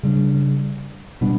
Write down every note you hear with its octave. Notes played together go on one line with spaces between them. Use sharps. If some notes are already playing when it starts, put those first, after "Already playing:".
C#3 G3 D4
B2 G3 B3 D4